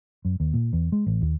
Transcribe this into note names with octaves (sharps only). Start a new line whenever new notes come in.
F#2
D#2
A#2
E2
G#3
A1
D#2